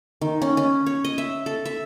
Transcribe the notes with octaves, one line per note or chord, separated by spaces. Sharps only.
D#3
C#4
C#4
C#5
D#5
E5
A4
E5